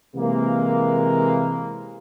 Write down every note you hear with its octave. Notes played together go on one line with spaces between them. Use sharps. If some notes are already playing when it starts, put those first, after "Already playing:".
C3 E3 G#3 A#3